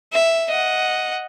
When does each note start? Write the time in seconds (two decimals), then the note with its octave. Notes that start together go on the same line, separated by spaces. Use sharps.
0.13 E5
0.50 D#5 F#5